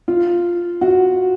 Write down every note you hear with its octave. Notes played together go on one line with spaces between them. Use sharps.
F4
F#4